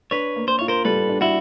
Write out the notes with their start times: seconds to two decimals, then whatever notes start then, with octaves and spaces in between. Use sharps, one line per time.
0.11 D4 B4 C#5
0.36 A#3
0.48 C5
0.59 F4 C#5
0.68 A#4 C5
0.85 G3 A4 B4
1.09 D4
1.21 E4 F#4